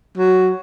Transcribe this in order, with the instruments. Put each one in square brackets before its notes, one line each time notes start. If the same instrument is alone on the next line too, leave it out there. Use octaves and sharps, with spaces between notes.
[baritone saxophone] F#3